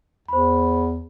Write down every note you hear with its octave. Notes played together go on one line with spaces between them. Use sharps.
E2 C5 B5